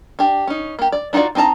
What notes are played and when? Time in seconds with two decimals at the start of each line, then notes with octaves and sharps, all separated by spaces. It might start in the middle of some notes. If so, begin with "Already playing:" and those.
0.19 D4 G4
0.47 C#4 D#4
0.79 A#3 G4
0.92 D5
1.13 D4 D#4 F4 F#4 D5
1.35 C4 D#4 A#4 A5 A#5